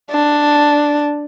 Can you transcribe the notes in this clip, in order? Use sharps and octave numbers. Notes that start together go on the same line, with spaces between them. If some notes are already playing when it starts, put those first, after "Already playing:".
D4